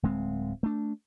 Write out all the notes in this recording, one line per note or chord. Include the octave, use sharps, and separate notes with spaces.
D1 G#3 C4
A3 D4